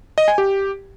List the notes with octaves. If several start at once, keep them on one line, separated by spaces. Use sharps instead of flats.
D#5
G#5
G4